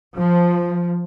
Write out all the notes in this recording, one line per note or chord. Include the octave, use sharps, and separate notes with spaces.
F3